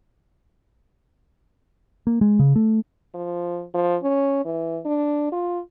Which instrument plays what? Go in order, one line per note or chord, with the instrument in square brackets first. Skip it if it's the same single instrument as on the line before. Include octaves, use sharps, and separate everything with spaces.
[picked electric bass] A#3
G#3
C#3
A3
[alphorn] F3
F3
C#4
E3
D4
F4